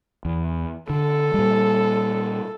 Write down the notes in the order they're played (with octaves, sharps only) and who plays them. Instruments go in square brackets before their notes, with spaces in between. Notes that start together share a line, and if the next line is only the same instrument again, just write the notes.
[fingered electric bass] E2
[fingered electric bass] D3 [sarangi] A4
[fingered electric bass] A#2 G3